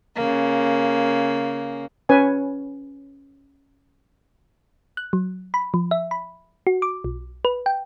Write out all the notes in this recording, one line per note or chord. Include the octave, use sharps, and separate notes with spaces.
C#3 A#3
C#4 B4 C#5 G#5
F#6
F#3
B5
F3
E5
B5
F#4
D6
B1
B4
G5